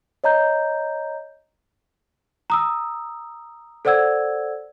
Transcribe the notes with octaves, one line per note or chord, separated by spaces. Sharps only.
C#5 D#5 A#5 G6
A#5 D#6 E6
A4 C5 D5 F#5 E6 G#6